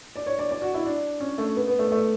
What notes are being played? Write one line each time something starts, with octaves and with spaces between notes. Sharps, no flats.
D5
C#5
D5
D5
F#4
E4
D4
C#4
A3
B3
B3
A3
A3